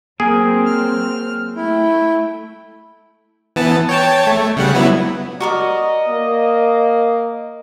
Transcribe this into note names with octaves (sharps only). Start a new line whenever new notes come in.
F#3 A#3 C4 G#4 A#4
F6
A3 E4 G5
E3 B3 A5
C#5 G5 A5
A3
C#3 G3 F#5
F#3 B3 E4
F#4 A#4 D5 D#5
A#3